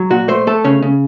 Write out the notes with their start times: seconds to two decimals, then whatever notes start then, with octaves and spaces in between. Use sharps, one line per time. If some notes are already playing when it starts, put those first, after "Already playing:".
Already playing: F#3
0.10 A#2 F#4
0.28 A3 C5
0.47 A3 A4
0.64 C#3 C#4
0.82 C#3